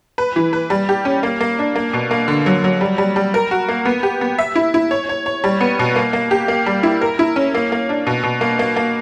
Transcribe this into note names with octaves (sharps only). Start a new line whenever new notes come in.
B4
E3
B4
G3
G4
C#4
A#3
A#3
D4
A#3
B2
A#3
D3
F#3
F#3
G3
G3
G3
A#4
F#4
A#3
B3
G4
B3
E5
E4
E4
C#5
C#5
C#5
G3
B3
B2
A#3
A#3
G4
A#3
G3
E4
A#4
E4
C#4
A#3
A#3
D4
B2
B2
A#3
A#3
A#3